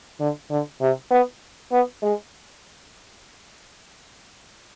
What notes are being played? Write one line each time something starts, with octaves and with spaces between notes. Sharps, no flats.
D3
D3
C3
B3
B3
G#3